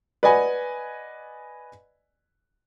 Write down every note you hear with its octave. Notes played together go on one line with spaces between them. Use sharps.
B4 D5 D#5 F#5 G#5 B5